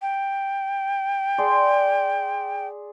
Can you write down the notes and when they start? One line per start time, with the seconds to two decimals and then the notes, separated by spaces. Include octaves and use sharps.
0.02 G5
1.38 G#4 D5 C6